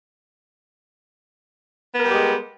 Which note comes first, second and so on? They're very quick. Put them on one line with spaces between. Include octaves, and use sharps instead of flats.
B3 A#4 G3 G4 G#3